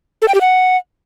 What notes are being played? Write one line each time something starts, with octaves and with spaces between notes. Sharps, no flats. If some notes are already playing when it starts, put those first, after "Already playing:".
A4
G5
G4
F#5